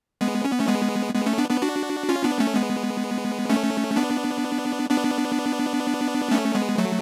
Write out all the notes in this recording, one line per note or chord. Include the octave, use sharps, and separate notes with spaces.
G#3 B3
C#4
B3
A3 C#4
G#3 B3
G#3 B3
A3 C#4
B3 D4
B3 D4
D4 F#4
C#4 F4
B3 D4
A3 C#4
G#3 B3
A3 C#4
B3 D4
B3 D4
A3 C#4
G#3 B3
F#3 A3